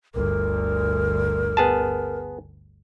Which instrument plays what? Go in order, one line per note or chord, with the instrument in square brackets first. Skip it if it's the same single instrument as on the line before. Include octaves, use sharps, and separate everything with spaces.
[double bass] G1 D2 [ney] A#4
[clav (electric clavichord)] B3 G#4 A5